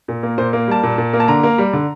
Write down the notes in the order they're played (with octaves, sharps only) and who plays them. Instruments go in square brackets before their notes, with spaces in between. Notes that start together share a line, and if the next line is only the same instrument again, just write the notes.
[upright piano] A#2
A#3
A#2 C5
A#3
G3 A5
A#2
A#2
A#3
A5
D3 A#5
A#3
G3
D3